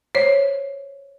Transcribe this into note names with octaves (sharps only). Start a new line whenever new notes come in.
C5 C#5